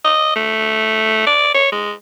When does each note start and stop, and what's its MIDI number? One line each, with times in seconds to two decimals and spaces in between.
0.05 0.31 75
0.36 1.23 57
1.27 1.51 74
1.54 1.72 73
1.72 1.93 56